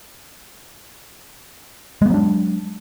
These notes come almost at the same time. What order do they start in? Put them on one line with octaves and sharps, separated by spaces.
G#3 B3 F#3 D4